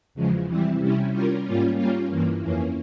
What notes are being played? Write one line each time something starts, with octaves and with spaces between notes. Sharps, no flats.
E2 C#3 F3 G#3
C3 E3 G3 C4 E4
C3 G3 C#4 E4
G3 C#4 F4 A#4
G#2 G3 A#3 C#4 F4
G3 A#3 C#4 F4
G2 E3 A#3
F2 E3 A#3 C#4